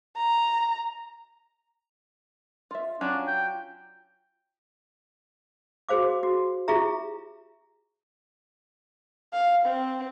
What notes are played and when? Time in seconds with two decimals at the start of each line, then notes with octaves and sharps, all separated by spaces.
0.17 A#5
2.71 F4 E5
3.01 F#3 C#4 D4 F4
3.28 G5
5.89 F#4 G#4 C5 F5 D6
6.23 F#4
6.68 E4 F4 G4 G#4 E5 A#5
9.33 F5
9.66 C4